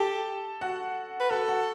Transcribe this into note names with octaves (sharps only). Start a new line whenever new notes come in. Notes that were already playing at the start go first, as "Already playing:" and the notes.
Already playing: G4 A4 A5
F#4 F#5
B4
F#4 A4 F#5
F#4 F#5